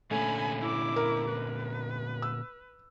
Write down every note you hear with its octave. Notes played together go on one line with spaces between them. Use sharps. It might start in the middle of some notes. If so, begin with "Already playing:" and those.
A#2 D3 A3 C#4 G#5 B5
E4 D6
A#4
B4
E6